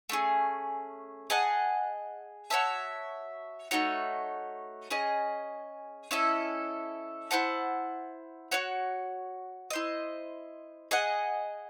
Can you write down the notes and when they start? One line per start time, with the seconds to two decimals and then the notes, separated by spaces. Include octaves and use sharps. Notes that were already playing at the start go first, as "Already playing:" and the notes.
0.09 A3 C#4 G#4
1.30 G#4 D#5 F#5 A5
2.50 F#4 C#5 E5 A5
3.71 A3 D#4 F#4 C#5
4.90 C#4 G#4 D#5
6.11 C#4 E4 A4 D#5
7.31 E4 C5 F#5 A5
8.51 F#4 C#5 F#5
9.70 E4 C5 D#5
10.91 G#4 D#5 F#5